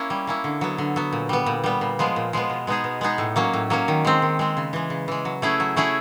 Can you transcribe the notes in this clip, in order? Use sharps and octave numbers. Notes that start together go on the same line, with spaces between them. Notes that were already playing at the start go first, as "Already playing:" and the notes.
Already playing: A#3 C#4 E4
G3
A#3 C#4 E4
D3
F#3 B3
D3
F#3 B3
A#2
G3 B3
A#2
G3 B3
A#2
F3 G#3 B3
A#2
F3 G#3 B3
B2
G#3 B3 D#4 G#4
B2
G#3 B3 D#4 G#4
A2
F#3 A#3 C#4
A2
F#3 A#3 C#4
D#3
G#3 C4
D#3
G#3 C4
C#3
E3 G#3
C#3
E3 G#3
F#3
A3 C#4 E4 G#4
F#3
A3 C#4 E4 G#4